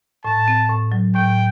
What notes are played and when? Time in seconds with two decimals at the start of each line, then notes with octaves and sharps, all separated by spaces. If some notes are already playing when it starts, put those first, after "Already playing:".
0.24 A2 A5
0.48 C4
0.69 A2
0.92 F#3
1.15 A2 G5